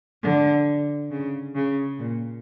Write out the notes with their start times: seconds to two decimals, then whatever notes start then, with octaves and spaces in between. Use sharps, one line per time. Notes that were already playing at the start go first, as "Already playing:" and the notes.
0.23 D3
1.11 C#3
1.55 C#3
1.99 A#2